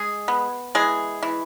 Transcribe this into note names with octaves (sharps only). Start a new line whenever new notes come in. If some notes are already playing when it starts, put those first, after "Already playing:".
Already playing: G#3 G#4
B3
E3 G#3 G#4
E3